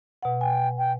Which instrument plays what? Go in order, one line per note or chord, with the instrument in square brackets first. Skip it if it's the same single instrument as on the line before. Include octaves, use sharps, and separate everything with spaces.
[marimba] B2 F#5
[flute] G5 [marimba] G#5
[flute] G5